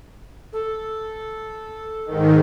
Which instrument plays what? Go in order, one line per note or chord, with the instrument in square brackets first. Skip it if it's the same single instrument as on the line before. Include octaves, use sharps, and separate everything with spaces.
[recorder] A4
[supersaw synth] G#2 D#3